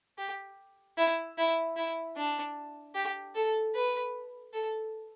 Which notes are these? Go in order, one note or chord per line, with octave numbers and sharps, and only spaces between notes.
G4
E4
E4
E4
D4
G4
A4
B4
A4